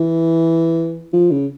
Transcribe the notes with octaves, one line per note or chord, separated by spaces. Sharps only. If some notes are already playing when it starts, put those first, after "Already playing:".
Already playing: E3
F3
C#3